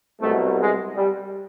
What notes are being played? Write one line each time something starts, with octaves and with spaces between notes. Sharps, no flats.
C2 B2 F#3 A3
G#3
G3